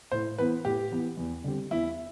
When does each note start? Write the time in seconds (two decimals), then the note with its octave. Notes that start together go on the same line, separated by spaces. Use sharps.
0.12 A2 C5
0.38 E3 B3 B4
0.65 A2 G4
0.91 E3 B3
1.17 E2
1.44 D3 G3 C4 G4
1.71 E2 E4